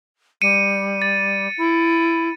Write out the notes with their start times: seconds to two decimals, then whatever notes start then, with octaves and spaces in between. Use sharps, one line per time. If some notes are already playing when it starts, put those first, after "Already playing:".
0.42 G3 C#7 D#7
1.02 A6
1.57 E4